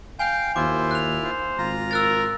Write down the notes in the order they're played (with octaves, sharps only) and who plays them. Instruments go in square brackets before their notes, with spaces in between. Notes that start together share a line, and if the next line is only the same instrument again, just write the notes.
[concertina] F5 G5 [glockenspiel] G#5 G6
[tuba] D#2 [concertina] E4 F4 [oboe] C5 [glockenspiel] D6
[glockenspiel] F#6 F7
[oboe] C5
[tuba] G#1 [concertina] F4 A#5
[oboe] A#4 [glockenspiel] E6 F#6 A6